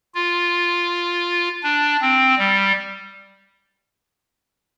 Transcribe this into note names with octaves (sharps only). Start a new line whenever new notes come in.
F4
D4
C4
G3